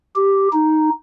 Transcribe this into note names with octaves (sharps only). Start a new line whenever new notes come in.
G4
D#4